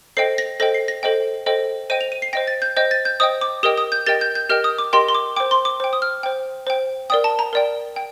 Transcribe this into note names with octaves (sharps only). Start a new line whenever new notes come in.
A4 C5 D#5 G5 C7
A#6
A4 C5 D#5 G5 A#6
C7
A#6
A4 C5 D#5 G5
A4 C5 D#5 G5
C5 D#5 G5 D#7
F7
D#7
C7
C5 D#5 G5 A#6
A6
G6
C5 D#5 G5 G6
A6
G6
C5 D#5 G5 D#6
D6
G4 A#4 D#5 G5 D#6
D#6
G6
G4 A#4 D#5 G5 A6
G6
G6
G4 A#4 D#5 G5 F6
D#6
D6
G4 A#4 D#5 G5 C6
C6
D6
C5 G5 D6
C6
D6
C5 G5
D#6
F6
C5 G5
C5 G5
A#4 D5 G5 D#6
A5
A#5
A#4 D5 G5
G5